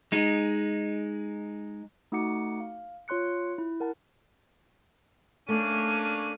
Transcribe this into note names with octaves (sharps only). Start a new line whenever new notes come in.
G#3 D#4
A3 D#4 F#4 F#5 D6 C#7
F5
F4 C#5 C6 F#6 C#7
E4
A#4 F#5 A5
A3 A#3 C#4 D4 D#7